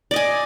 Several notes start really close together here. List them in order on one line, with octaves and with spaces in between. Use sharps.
D5 D#5 G#5